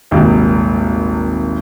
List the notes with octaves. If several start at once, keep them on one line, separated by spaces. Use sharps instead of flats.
D#1 G#1 C3